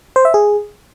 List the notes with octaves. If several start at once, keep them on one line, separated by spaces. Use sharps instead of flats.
C5
E5
G#4